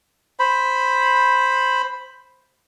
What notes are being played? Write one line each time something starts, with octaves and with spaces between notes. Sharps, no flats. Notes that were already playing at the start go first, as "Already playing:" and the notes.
C5 B5